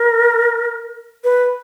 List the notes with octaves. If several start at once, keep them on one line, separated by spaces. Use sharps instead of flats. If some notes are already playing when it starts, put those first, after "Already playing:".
Already playing: A#4
B4